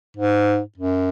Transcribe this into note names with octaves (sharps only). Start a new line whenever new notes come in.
G#2
F#2